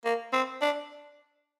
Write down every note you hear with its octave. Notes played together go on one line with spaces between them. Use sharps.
A#3
C4
D4